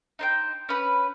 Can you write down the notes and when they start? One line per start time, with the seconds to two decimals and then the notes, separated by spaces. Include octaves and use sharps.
0.19 D#4 C5 G5
0.69 C#4 B4